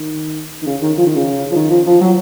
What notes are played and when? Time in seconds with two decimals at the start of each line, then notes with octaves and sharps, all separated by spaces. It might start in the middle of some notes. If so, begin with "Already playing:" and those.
Already playing: D#3
0.62 D#3
0.66 C#3
0.82 D#3
0.97 F3
1.06 D#3
1.16 C#3
1.51 F3
1.56 D#3
1.70 F3
1.86 F3
2.01 F#3